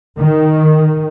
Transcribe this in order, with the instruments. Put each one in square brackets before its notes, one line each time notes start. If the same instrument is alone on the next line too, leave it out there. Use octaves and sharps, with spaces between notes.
[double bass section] D#3